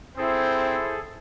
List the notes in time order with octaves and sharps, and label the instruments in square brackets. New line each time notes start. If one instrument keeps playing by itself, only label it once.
[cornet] C4 [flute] E4 [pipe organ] G#4 A4 [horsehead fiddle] C5